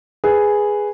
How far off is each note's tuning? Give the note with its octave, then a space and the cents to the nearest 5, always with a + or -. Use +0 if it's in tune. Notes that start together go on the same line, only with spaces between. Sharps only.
G#4 +0 B4 +0